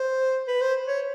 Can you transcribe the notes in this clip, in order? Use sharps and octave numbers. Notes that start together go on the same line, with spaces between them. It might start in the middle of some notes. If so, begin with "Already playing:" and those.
Already playing: C5
B4
C5
C#5